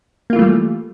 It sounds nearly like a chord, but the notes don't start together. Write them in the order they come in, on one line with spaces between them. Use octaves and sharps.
A#3 F4 E3 A3 G3